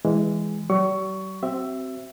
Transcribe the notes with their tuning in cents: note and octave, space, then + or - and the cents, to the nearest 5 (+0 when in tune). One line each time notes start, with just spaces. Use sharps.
E3 +0 G#3 -10
G3 -45 C#6 +15
C4 +0 F#4 +45 E5 +10